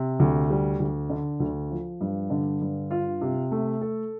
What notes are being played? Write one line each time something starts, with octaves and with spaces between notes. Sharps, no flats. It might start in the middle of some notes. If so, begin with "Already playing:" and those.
Already playing: C3
D2
G3
D2
D3
D2
F3
G2
D3
G2
F4
C3
A3
A4